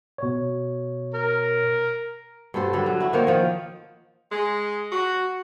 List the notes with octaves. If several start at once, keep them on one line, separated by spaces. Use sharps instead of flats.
B2 C#5
A#4
G2 F#3 A4 C5
D3 F#3 G3 A4
F#3
E4 F#4
D#3 A#3 C5 C#5
D#3 F3
G#3
F#4